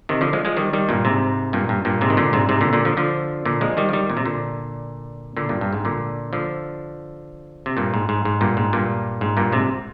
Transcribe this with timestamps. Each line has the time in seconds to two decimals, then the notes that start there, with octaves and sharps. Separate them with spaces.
0.09 C3 D#3
0.21 D3 F3
0.33 F3 G#3
0.45 F3 G#3
0.57 D#3 G3
0.73 D#3 G3
0.89 G2 A#2
1.05 G#2 C3
1.53 G2 A#2
1.69 G2
1.85 G2 A#2
2.01 G#2 C3
2.10 D#3
2.17 A#2 D3
2.33 G#2 C3
2.49 G#2 C3
2.61 A#2 D3
2.73 A#2 D3
2.85 D3 F3
2.97 D3 F3
3.45 A#2 D3
3.61 F3 G#3
3.77 D#3 G3
3.89 F3
3.93 D#3 G3
4.10 A#2
4.17 C3
4.25 A#2 D3
5.37 A#2 D3
5.49 G2 A#2
5.61 G2
5.73 G#2
5.85 A#2 D3
6.33 D3 F3
7.66 C3
7.77 G2 A#2
7.94 G#2
8.09 G#2
8.25 G#2
8.41 G2 A#2
8.57 G#2
8.73 G2 A#2
9.21 G#2
9.37 G2 A#2
9.52 G#2 C3